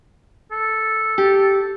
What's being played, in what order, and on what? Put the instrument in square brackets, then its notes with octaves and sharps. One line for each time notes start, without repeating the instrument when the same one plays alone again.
[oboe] A4
[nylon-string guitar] G4